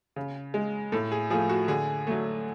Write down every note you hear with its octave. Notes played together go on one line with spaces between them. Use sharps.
C#3
G#3
A2 A4
G#4
F3 A3 G#4
F#4
D3 G#4
F#3 A3